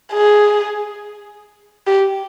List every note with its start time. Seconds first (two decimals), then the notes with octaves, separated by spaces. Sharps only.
0.13 G#4
1.87 G4